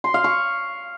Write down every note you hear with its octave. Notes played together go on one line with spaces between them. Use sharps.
C6
F5
C#6